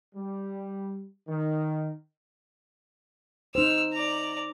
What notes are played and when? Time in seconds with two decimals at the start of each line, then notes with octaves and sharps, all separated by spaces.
0.15 G3
1.28 D#3
3.55 D#4 C5 E6 F6
3.93 D5 A#5